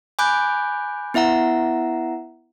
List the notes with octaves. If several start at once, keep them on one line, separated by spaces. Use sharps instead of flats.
G#5 B5 D6 F#6 G6
B3 E4 E5 F#5 A#5